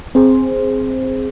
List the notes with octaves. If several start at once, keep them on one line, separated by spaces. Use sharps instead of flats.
C4 G#4 C5